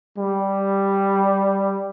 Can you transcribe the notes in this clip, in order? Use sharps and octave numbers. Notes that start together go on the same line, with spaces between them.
G3